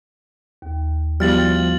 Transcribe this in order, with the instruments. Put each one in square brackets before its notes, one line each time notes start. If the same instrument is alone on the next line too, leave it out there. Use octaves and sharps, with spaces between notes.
[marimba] D#2
[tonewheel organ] F3 [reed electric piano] G3 E4 [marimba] B3 F#4 [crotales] F6 A6 F#7